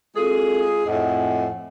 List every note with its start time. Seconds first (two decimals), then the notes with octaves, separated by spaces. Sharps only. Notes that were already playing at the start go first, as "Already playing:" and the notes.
0.16 G#3 C4 F4 F#4 G#4 A4
0.86 F2 A2 D#5 F#5 G#5